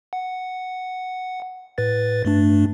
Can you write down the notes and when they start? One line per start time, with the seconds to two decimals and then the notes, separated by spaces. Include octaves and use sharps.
0.13 F#5
1.78 A2 B4 A6
2.25 G2 A3 D4